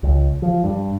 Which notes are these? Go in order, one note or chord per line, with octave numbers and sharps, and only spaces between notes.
C#2
F3
G2